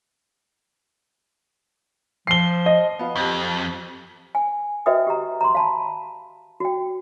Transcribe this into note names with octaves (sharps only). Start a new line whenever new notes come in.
F3 C7 G7
D#5
B3 F4
F2 C4 G4
G#5
F#4 B4 D#5 E5 G5 D#6
G4 A#5
A#5 C6
F5 A5 B5
F#4 G5